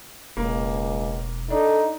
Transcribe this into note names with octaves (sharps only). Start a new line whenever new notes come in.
E1 C#2 A#3
D4 D#4 A4